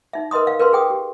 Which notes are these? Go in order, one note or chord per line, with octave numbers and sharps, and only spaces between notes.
D#4 E5
A#4 B4 D#5 C6 D#6
F5
A#4 B4 F5 C6
G#4 G5 D#6
G4